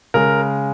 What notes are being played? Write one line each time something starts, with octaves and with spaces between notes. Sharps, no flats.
C#3 G#3 A#4